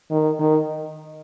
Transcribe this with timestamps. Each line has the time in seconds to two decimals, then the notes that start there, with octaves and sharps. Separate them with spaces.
0.11 D#3
0.39 D#3